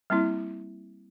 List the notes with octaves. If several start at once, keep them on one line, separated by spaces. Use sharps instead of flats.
G3 A#3 C4 E4